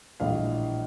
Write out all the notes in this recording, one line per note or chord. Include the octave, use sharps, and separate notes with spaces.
A#1 A2 E3 G3 D#5 F5